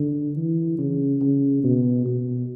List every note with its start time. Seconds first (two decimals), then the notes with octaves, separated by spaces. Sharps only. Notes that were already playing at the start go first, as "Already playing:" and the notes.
Already playing: D3
0.36 E3
0.79 C#3
1.22 C#3
1.64 B2
2.06 B2